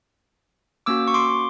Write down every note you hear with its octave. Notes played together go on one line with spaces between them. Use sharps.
A#3 C#4 F#4 D6 E6
C#6
C6 D6